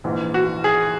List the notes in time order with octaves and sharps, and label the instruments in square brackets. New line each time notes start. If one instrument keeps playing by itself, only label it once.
[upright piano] A#1 G#2 E3
F#4
G#4